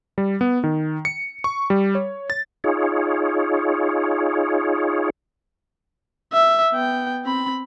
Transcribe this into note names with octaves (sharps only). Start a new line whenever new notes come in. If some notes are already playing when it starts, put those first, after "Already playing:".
G3
B3
D#3
C#7
C#6
G3
C#5
A6
D#4 F4 G#4 C#5
E5
B3 G5
C4 B5